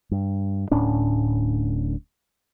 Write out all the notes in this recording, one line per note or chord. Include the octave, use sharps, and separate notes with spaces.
G2
D1 A2 C#4 D4